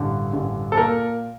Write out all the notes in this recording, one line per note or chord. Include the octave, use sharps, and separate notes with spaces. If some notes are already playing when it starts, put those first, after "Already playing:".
Already playing: A1 G2 D3
A1 G2 D3
A4
A#2 A#4